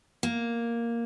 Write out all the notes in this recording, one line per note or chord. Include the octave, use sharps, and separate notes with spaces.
A#3